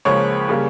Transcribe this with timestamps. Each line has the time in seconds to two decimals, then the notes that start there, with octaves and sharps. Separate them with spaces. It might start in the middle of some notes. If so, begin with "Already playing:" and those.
0.05 C#2 C#3 F3 A#3 C#5
0.49 C#3 G3 A#3